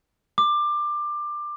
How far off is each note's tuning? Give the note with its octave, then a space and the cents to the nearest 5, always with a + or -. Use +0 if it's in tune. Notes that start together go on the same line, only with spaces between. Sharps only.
D6 +20